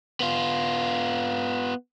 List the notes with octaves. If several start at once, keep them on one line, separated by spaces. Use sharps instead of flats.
B3 F4